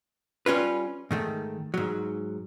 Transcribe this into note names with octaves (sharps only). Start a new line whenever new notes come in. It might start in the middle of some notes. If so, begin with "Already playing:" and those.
G3 C#4 F4 B4
G#2 D#3 A3
G#2 F#3